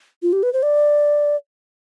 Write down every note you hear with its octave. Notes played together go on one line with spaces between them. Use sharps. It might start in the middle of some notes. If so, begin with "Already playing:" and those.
F4
G4
B4
C5
D5